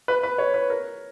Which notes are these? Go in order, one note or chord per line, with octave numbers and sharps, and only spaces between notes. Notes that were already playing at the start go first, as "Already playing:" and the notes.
B4
B4
C#5
B4
A#4